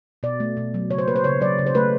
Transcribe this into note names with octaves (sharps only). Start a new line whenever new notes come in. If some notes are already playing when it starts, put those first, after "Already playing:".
B2 D5
A3
B2
F#3
C#3 C#5
C5
A#3 B4
C5
C#3 C#5
F#3 D5
C#3
C5
A3 B4